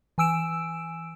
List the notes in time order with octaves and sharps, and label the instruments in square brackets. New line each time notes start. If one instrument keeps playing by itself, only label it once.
[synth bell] E3 G#5 E6 D7 E7